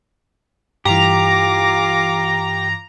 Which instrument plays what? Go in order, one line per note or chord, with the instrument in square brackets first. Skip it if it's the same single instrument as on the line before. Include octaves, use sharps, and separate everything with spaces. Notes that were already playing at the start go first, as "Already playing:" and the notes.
[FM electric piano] G2 E3 [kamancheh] F4 D6 [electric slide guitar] G4 [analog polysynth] A#5